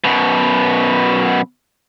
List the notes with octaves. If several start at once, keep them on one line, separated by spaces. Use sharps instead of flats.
F#2 B2